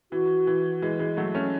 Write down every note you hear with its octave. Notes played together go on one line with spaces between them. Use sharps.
E3 F#4
E3
E3 G#3
E3 G#3
F#3 A3
A3 C#4